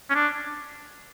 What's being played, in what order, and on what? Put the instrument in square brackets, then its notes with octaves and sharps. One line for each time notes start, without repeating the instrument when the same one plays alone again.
[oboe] C#4
D4